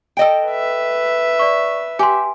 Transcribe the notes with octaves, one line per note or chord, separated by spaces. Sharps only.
A4 D#5 G5 D7
B4 E5
D5 C#6
G4 G#5 C6